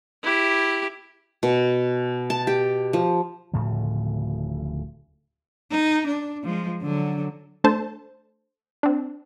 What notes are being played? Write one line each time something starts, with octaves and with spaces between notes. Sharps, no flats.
E4 G4
B2
A5
G4
F3
D1 A2 C#3 F3
D#4
D4
F3 G#3
D3 F#3
A3 D4 A4 C5 A5
C4 D4